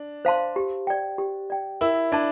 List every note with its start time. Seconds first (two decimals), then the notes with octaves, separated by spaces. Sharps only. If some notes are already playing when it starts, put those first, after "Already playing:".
Already playing: D4
0.25 C5 F5 A5 C6
0.56 G4
0.87 D5 G5
1.18 G4
1.50 D5 G5
1.81 E4 A#4
2.12 D4 D5 A5